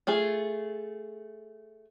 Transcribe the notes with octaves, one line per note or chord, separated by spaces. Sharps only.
A3 F4 G#4